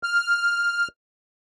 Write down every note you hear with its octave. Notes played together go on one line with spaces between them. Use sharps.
F6